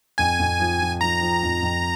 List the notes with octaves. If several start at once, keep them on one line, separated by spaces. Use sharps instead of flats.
F2 G#5
F2
F3
F3
F3 A#5
F3
F2
F2